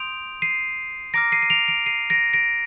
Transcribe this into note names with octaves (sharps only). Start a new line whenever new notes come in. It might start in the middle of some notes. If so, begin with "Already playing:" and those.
Already playing: C6 D#6 G6 D7 F7
C7 D#7
A#5 D6 F6 A#6 D7
C7 D#7
D#7
D7 F7
D7 F7
C7 D#7
A#6 D7
A#6 D7